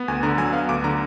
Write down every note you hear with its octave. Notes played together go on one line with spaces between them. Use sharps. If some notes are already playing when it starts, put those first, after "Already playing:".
Already playing: B3
D2 G#5
D3 A#5
F#3 G#5
B3 F5
D2 D6
D3 A#5